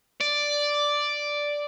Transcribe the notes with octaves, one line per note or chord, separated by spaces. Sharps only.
D5